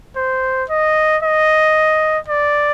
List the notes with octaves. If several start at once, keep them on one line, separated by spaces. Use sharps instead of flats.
C5
D#5
D#5
D5